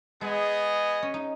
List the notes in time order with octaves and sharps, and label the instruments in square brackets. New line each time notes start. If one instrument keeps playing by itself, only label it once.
[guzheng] G#3 [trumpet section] B3 G#4 D#5
[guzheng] C#4
D#4